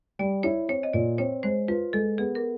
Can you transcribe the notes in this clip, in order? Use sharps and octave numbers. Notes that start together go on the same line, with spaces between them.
G3 D5
E4 C#5
C4 C#5
D#5
A#2 D5
C4 C#5
G#3 C5
F4 B4
G#3 A4
B3 G#4
A#4